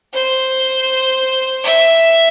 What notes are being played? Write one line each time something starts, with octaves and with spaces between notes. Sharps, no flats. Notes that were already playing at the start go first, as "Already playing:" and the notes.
C5
E5